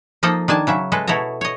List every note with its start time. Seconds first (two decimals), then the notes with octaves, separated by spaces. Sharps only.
0.23 F3 A#3 D#4 A4 D#5
0.48 D#3 D4 G#5 A5
0.67 C#3 F#3 E5
0.92 G#3 A4 B4
1.08 B2 E4 A4 C#5 A#5
1.41 C#5 D#5